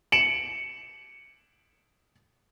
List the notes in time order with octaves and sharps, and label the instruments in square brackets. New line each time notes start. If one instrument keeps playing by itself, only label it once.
[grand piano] C#7 D7 E7 F#7